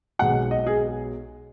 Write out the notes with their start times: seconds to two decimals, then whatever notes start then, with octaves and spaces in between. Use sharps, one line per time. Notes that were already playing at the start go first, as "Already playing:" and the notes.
0.19 B1 B2 G#3 F#5
0.51 D#5
0.66 G#4